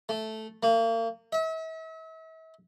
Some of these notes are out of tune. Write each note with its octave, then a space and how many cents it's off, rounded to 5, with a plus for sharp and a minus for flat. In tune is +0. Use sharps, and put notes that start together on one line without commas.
A3 -5
A#3 -40
E5 -40